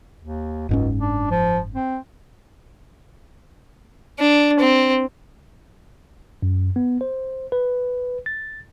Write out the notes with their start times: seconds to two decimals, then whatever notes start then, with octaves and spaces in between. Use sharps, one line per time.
0.20 D#2
0.69 F#1 C#2 G#2 C#4
0.99 D4
1.31 F3
1.75 C4
4.19 D4
4.59 C4
6.42 F#2
6.76 B3
7.01 C5
7.52 B4
8.26 A6